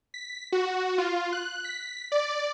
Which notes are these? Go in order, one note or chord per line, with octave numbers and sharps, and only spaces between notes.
B6
F#4
F4
F#6
B6
D5